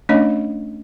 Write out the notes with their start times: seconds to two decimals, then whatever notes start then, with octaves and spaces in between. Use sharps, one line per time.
0.09 A3 C#4 D4 C#5 D#5